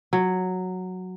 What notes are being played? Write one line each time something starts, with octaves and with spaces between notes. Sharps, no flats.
F#3